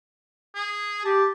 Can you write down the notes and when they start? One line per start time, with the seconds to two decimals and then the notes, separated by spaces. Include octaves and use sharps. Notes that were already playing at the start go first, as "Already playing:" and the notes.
0.55 G#4
1.05 G4 A5